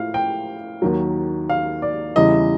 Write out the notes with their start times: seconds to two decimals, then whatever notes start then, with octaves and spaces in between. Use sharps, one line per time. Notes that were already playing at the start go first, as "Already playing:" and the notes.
Already playing: A2 F3 F5
0.14 G5
0.82 D#2 D#3 F#3
1.50 F5
1.82 D5
2.16 E2 C#3 E3 G3 D#5